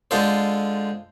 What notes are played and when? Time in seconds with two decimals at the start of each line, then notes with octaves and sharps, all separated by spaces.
0.11 D3 G#3 F4 A4 C5